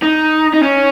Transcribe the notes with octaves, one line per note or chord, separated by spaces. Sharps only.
D#4
D#4
C#4